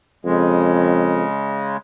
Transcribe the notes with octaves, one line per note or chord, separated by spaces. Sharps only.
F2 C#3 G#3